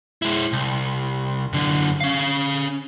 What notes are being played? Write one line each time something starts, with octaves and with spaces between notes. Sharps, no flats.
G#3 E4
C2
F#2 D3
C#4 F5